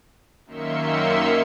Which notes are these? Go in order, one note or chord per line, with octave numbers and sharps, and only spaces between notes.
F#2 D#3 A#3 E5 C6 C#7